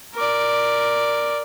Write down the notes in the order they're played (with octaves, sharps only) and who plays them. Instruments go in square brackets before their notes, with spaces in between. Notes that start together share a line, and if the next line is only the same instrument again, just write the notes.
[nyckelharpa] A#4 D5